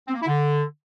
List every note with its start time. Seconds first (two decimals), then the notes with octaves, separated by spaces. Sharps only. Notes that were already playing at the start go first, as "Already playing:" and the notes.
0.07 C4
0.14 A#3
0.21 E4
0.27 D3